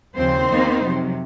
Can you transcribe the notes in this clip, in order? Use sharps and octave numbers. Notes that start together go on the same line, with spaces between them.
D#2 C#3 F3 C4 C5
D#2 D#3 A#3 D#4
F2 C3 F#3